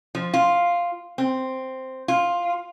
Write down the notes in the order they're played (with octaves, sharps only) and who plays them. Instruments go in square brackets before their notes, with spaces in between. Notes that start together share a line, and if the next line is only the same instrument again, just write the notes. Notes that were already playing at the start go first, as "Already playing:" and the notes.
[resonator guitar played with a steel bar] F3
F4
C4
F4